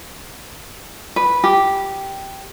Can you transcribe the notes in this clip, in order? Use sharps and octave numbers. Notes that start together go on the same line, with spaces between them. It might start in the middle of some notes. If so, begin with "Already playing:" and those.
B4
G4